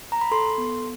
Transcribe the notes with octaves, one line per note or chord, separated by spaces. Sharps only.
A#5
B5
A4 C6
B3